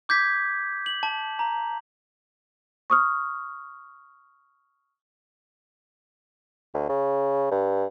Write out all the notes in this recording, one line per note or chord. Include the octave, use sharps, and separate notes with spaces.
D6 G6 G#6 B6
F#7
A5
A#5
C#6 D#6 F6
D2
C#3
G2